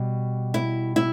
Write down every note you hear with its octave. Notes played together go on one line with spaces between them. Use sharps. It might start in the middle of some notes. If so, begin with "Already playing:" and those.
Already playing: B2 G3
E4
E4